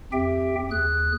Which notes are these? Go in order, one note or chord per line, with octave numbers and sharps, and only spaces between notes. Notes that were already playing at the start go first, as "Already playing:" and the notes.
F2 C4 G4 E5 G5
D#2 G#4 F#6